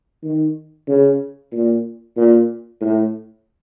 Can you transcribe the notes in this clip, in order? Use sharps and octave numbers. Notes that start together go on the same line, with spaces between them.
D#3
C#3
A#2
A#2
A2